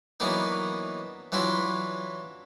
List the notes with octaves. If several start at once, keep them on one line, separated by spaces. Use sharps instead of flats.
E3 F#3 A#3 B3 D4 D#4
E3 F#3 D4 E4 F4